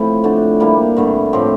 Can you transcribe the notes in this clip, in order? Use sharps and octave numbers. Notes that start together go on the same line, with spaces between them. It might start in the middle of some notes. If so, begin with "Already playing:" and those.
Already playing: A2 F3 C4 E4
D3 A3 D4
C3 G3 A#3 E4
G2 D3 A3
A2 F3 C4 G4